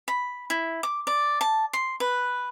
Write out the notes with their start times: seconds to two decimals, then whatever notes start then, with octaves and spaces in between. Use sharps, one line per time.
0.08 B5
0.50 E4
0.83 D6
1.07 D5
1.41 A5
1.73 C6
2.00 B4